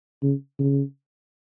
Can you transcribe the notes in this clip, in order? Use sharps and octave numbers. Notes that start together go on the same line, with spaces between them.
C#3
C#3